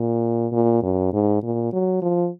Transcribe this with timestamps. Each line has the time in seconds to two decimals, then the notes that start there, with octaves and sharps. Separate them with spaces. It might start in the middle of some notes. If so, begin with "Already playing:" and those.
Already playing: A#2
0.52 A#2
0.82 F#2
1.13 G#2
1.43 A#2
1.72 F#3
2.02 F3